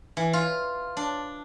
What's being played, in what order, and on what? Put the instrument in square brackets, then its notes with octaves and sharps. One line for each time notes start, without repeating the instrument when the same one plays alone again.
[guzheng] E3
F4
D4